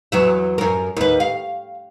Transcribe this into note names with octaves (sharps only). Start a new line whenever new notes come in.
E2 F#3 E5
F#2 A#4
D#2 B4
F5